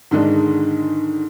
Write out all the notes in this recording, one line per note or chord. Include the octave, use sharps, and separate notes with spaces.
G#2 D3 D#3 G#3 D4